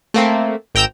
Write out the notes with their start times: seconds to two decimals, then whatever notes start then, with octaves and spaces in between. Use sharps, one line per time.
0.14 A3 A#3 C4
0.75 G#1 G5 A#5 E6 G6 E7